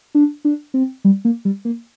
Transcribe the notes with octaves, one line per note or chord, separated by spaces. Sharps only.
D4
D4
C4
G3
A#3
G3
A#3